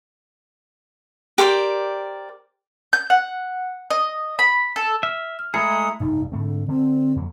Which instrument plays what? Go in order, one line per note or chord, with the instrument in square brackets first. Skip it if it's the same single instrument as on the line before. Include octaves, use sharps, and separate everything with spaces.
[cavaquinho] G4 A#4 C5 D5
[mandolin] G6
F#5
D#5
B5
A4
[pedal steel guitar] E5 [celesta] F6
[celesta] F6
[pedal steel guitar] G#3 A3 G#4 [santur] E4 A#5 [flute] D#6 [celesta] C#7
[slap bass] F1 A#1 G2 [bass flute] D#4
[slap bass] G#2 A3 C4 [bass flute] D3
[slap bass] D3 [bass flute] C4
[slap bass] F2 F#3 A#3